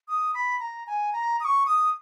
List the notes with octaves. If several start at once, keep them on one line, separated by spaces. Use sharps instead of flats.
D#6
B5
A#5
G#5
A#5
D#6
C#6
D#6